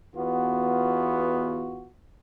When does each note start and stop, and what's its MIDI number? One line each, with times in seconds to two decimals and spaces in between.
0.15 1.88 40
0.15 1.88 59
0.15 1.88 65
0.15 1.88 66